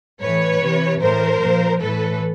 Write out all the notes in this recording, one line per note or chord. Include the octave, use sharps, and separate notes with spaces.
A2 E3 B4 C#5
C3 E3
A2 E3 A#4 C5
A#2 F3
A2 E3 A4 B4